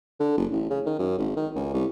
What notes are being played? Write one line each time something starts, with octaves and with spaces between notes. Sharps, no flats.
D3
F#1
A1
C#3
D#3
F#2
G#1
D#3
C#2
C2